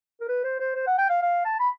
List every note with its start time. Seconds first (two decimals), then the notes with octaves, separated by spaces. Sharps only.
0.21 A#4
0.29 B4
0.44 C5
0.60 C5
0.75 C5
0.87 F#5
0.98 G5
1.10 F5
1.22 F5
1.45 A5
1.60 B5